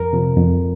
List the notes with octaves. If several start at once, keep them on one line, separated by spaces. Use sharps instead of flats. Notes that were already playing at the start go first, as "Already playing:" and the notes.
Already playing: F2 A#4
C3 F3
F2